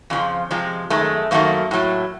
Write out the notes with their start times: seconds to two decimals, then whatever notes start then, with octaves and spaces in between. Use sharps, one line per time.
0.10 F2 C#3 F3
0.51 C3 F3 G#3
0.90 F#2 D#3 G#3 A3
1.31 F#2 D#3 F#3 A3 A#3
1.71 A2 F#3 A3